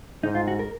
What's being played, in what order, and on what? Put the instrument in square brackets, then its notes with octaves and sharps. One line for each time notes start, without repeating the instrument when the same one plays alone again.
[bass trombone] G#2 [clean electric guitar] D#4
[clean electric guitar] F4
F#4
A#4